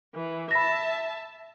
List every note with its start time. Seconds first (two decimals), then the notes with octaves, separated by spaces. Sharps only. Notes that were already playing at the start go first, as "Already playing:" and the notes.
0.15 E3
0.51 E5 A5 B5 A#6